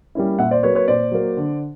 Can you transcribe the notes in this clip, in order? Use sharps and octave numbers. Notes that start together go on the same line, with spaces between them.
G3 A#3 C#4 E4
A#2 E5 F#5
C5 D5
F#3 A#3 B4 C#5
B4 C#5
A#2 C5 D5
F#3 A#3
D3